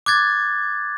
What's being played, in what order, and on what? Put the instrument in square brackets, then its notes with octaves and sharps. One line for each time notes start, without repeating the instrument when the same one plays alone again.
[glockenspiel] D6 F#6 G#6 A6